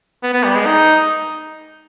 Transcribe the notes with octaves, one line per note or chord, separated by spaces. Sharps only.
B3
B3
G3
G#3
D#4